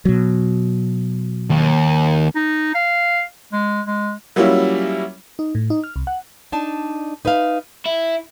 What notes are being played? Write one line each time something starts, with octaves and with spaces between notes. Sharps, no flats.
B2 F#3
D#2
D#4
F5
G#3
G#3
F#3 G3 A#3 C#4 E4 F4
D#4
A2
D#4
F6
C2
F#5
D4 D#4 A5
D#4 B4 E5 F5
E4